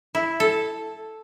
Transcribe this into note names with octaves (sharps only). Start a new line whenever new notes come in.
E4
A4